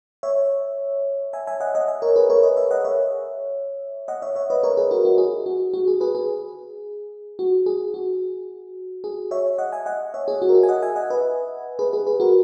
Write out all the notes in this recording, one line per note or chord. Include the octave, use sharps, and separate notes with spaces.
C#5 E5
E5 G#5
E5 G#5
D#5 F#5
D#5 F#5
E5 G#5
A#4 C#5
G#4 B4
A#4 C#5
B4 D#5
C#5 E5
D#5 F#5
C#5 E5
D#5 F#5
C#5 E5
C#5 E5
B4 D#5
A#4 C#5
G#4 B4
F#4 A#4
F#4
G#4
F#4
F#4
G#4
G#4 B4
G#4
F#4
G#4
F#4
G#4
C#5 E5
D#5 F#5
E5 G#5
D#5 F#5
C#5 E5
G#4
F#4
A#4
G#4
G#5
D#5 F#5
E5 G#5
D#5 F#5
B4 D#5
G#4 B4
G#4 B4
G#4 B4
F#4 A#4